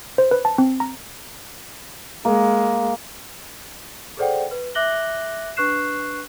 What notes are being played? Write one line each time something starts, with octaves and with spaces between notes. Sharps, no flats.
C5
B4
A5
C4
A#5
G#3 A#3
G#4 A4 C5 D5 F#5 G5
B4
E5 D6 F#6 A#6 F#7 G7
D4 B4 C#6 F#6 C7 E7